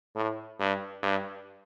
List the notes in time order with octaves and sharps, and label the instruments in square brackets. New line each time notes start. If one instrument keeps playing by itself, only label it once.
[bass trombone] A2
G2
G2